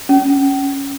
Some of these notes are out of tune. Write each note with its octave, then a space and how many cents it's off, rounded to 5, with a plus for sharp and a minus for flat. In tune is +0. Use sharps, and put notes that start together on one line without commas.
C#4 -5